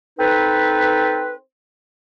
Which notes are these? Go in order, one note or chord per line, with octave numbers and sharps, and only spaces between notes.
C4 D#4 A4 B4